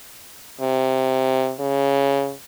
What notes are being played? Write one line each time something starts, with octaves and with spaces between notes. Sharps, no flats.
C3
C#3